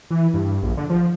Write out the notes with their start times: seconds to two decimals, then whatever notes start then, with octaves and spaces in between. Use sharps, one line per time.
0.11 E3
0.34 G2
0.63 A#1
0.77 D3
0.90 F3